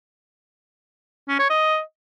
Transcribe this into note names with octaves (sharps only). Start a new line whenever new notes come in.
C#4
C#5
D#5